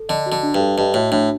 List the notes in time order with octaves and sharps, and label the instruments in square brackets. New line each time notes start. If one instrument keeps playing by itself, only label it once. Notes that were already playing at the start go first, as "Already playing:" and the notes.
Already playing: [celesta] A4
[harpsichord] D3 [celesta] D#5
[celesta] F#4
[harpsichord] D3
[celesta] D4
[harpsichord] G2
[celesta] A4
[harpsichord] G2 [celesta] D#5
[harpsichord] A2 [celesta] F#4
[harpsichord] A2 [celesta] D4